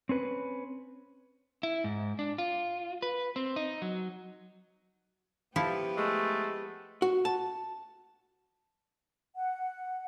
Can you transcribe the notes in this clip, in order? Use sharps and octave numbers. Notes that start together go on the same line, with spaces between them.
C4 C#4 B4
E4
G#2
D4
F4
B4
C4
D#4
F#3
F3 B3 E4 G4 A4
G#3 A3
F#4
A5
F#5